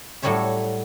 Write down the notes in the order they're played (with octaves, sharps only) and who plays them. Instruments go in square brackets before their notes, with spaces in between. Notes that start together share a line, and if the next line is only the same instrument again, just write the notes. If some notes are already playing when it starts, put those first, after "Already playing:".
[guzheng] A2 F#3 G3 A4 C#5 E5